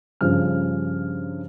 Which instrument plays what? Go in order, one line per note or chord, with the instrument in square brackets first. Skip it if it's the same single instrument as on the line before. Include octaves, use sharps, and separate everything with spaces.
[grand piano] G2 C#3 F3 F6